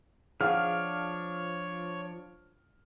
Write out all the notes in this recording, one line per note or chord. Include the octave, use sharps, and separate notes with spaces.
F3 D4 G#4 C#5 F5 F#5 F6